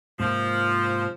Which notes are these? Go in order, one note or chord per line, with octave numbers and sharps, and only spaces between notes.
G#2 C3 F3 A#3